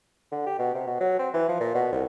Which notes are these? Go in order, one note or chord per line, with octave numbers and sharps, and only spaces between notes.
D3
G4
B2
C3
B2
F#3
C4
E3
F3
A#2
B2
C2